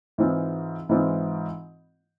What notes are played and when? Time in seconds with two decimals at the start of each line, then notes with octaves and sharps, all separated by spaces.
0.18 G#2 E3 G#3 C4 F4
0.89 G#2 E3 G#3 C4 F4